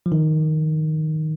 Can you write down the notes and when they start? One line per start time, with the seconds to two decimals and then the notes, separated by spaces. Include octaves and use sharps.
0.06 F3
0.12 D#3